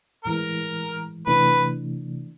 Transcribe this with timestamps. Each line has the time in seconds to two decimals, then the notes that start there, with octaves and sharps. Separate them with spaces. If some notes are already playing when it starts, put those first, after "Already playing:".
0.25 A2 E3 G#3 A#4
1.26 C3 E3 A3 D4 B4